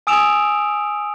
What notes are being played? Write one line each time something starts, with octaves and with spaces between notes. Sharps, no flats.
G#5 D#6 E6 D7 E7 F7